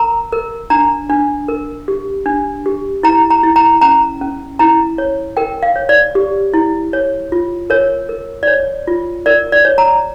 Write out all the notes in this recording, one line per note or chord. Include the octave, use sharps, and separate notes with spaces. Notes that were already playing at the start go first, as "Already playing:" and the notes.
Already playing: A#4 A#5
A#4
D4 A#5
D4
A#4
G4
D4
G4
E4 A#5
A#5
E4
A#5
C#4 A#5
C#4
E4 A#5
C#5
A#4 G5
F5
C#5
D5
G4
E4
C#5
F4
A#4 C#5
A#4
D5
C#5
F4
A#4 D5
D5
C#5
A#5